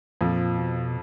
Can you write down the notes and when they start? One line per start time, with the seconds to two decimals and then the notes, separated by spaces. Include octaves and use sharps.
0.21 F2 A#2 F3
0.58 B2